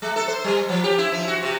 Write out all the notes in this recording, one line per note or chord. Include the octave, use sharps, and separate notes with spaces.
G#3
A4
C5
G3
F3
G4
E4
F3
F#4
C3